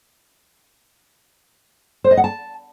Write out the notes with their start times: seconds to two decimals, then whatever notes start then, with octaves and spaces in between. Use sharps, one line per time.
2.04 C5
2.11 D#5
2.17 F#5
2.24 A5